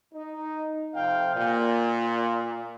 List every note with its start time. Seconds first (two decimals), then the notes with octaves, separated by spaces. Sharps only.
0.14 D#4
0.95 F2 C3 F5 G5
1.35 A#2